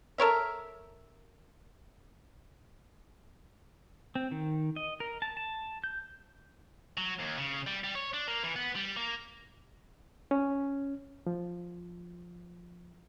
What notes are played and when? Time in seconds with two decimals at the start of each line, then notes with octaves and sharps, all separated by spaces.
0.18 A4 A#4 C#5 E5
4.15 C4
4.31 D#3
4.76 D#5
5.00 A#4
5.22 A5
5.37 A5
5.84 G6
6.98 F#3
7.20 D#2
7.39 C#3
7.67 G3
7.84 G3
7.95 C#5
8.13 D4
8.28 A#3
8.43 E3
8.56 B3
8.75 G3
8.97 A#3
10.31 C#4
11.27 F3